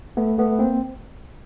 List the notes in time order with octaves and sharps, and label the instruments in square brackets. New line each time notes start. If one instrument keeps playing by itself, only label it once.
[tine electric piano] A3 B3
A3 B3
A#3 C4